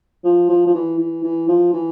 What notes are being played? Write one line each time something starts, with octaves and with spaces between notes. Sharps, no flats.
F3
F3
F3
E3
E3
E3
F3
E3